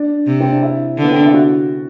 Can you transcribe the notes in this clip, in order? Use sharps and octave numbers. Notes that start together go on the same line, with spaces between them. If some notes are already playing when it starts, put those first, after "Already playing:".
Already playing: D4
C3
C4
D4
E4
D3
B3
C4
D4
E4
F#4